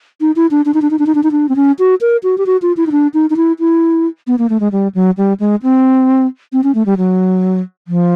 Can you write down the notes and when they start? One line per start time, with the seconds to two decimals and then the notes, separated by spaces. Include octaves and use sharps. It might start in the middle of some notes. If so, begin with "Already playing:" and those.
0.21 D#4
0.36 E4
0.51 D4
0.66 D4
0.74 D#4
0.82 D4
0.91 D#4
0.99 D4
1.07 D#4
1.15 D4
1.23 D#4
1.32 D4
1.49 C4
1.56 C#4
1.79 F#4
2.01 A#4
2.23 F#4
2.38 G4
2.46 F#4
2.62 F4
2.77 E4
2.87 D#4
2.92 D4
3.14 D#4
3.30 D#4
3.37 E4
3.60 E4
4.27 B3
4.38 A#3
4.50 A3
4.60 G#3
4.72 G3
4.95 F#3
5.17 G3
5.40 G#3
5.63 C4
6.53 C4
6.64 C#4
6.75 A3
6.86 G3
6.98 F#3
7.88 F3